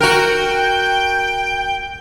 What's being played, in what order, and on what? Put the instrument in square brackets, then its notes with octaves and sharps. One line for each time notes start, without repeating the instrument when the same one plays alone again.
[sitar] F#4 A#4 [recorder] G5